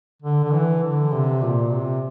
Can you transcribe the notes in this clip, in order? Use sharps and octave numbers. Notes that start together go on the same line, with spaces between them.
D3
D3
E3
D3
C3
A#2
C3